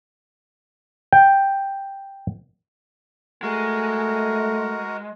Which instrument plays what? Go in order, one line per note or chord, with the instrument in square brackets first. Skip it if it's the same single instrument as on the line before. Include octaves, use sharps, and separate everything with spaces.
[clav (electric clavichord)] G5
[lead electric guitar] G#3 [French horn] A3 [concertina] F#4 A#4